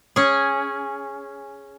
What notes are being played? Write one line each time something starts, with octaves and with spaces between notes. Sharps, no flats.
C#4 G#4